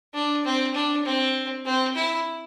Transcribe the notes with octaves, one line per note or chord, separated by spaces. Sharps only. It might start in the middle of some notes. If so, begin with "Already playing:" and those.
D4
C4
D4
C4
C4
E4